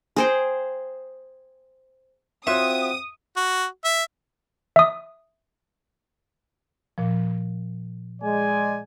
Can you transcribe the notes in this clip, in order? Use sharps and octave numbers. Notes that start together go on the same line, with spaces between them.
G#4 C5 G5
C4 F4 F#4 C#5 E5 D#6
F#4
E5
E5 D#6
A#2 F3
G#3 D5 G#5